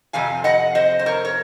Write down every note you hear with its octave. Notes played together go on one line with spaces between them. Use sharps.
F2 C3 F3 F5 G#5
D#5 F#5
C5 D#5
C5
A#4 C#5
C#5